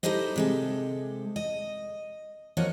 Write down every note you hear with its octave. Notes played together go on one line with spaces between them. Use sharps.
D#4 E4 G4 A4 C5 D#5
C3 G#3 A4
D#5
F3 A#3 F#4 C#5 D#5